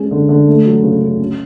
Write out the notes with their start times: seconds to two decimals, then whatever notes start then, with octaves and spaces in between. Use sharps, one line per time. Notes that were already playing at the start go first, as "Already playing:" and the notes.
Already playing: G#3 C#4
0.11 D3
0.29 D3
0.47 A3
0.65 F#3
0.83 C#3
1.01 C#3
1.19 C#4